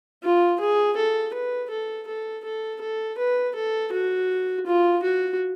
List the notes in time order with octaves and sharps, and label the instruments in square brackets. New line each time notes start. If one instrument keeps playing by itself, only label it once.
[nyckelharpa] F4
G#4
A4
B4
A4
A4
A4
A4
B4
A4
F#4
F4
F#4